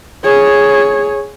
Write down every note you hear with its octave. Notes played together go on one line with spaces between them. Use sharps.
G#4 C#5